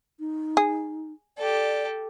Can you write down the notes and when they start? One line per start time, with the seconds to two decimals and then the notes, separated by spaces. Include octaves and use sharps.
0.20 D#4
0.57 G#4
1.37 G4 A4 D5